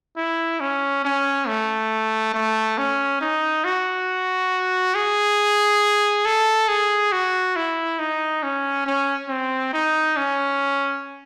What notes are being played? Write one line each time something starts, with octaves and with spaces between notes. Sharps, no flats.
E4
C#4
C#4
A3
A3
C#4
D#4
F#4
G#4
A4
G#4
F#4
E4
D#4
C#4
C#4
C4
D#4
C#4